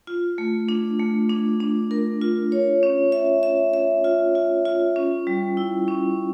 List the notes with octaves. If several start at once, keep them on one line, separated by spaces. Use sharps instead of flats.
F4
A3
D4
A3
D4
D4
A#4
F4
C#5
C#4
E5
E5
E5
F4
F4
F4
C#4
G3
E4
C#4